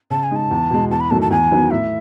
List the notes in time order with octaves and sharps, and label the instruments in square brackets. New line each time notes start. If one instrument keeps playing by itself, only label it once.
[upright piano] C#3 [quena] A5
[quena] G#5
[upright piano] G#3 D#4 [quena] A5
[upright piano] E2
B2 G#3
[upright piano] E2 [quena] A5
[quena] B5
[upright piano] D#3 F#3 A3 [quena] A5
[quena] A5
[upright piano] E2 [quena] G#5
[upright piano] D#3 F#3 B3
[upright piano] A2 [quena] E5